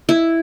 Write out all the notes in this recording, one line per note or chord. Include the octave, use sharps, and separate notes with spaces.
E4